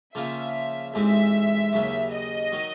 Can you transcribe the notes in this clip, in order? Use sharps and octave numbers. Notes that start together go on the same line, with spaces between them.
C#3 F3 A#3 C#4 F4 E5
A1 G#2 E3 G#3 C4 E5
D#2 C#3 F#3
D#5
D#3 F#3